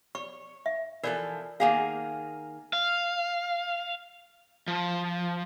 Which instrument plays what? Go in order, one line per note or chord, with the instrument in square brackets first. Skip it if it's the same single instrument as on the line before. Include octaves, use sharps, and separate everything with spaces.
[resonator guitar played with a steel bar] C#5 [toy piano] C#6
[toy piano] E5
[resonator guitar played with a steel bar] E3 F3 A4 [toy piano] A#4 D5
[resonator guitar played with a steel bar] D#3 A#3 G#4 [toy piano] F5 F#5
[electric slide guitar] F5
F3